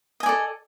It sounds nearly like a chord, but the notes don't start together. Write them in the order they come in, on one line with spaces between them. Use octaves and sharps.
D#5 G#5 D5 A4